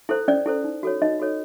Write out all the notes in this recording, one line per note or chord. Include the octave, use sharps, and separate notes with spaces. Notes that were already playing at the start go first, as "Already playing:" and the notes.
E4 A4 C5
C#4 D5
E4 A4 C5
D#4
F#4 A4 C#5
D#4 D#5
F#4 A4 C#5